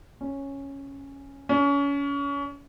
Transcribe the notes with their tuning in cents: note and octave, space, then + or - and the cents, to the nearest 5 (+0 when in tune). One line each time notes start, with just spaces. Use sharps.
C#4 -5
C#4 +30